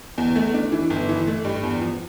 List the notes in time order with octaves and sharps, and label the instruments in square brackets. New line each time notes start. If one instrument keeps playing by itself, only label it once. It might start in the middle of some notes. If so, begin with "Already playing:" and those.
[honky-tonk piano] E2
A3
D4
E3
G1
E3
A3
G2
E2
F3